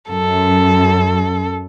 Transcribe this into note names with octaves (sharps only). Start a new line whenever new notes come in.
F#2 A4